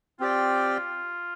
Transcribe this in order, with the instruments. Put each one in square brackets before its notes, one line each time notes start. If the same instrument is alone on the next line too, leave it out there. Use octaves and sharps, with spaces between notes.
[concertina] C4 G4 D5 G5 [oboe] F4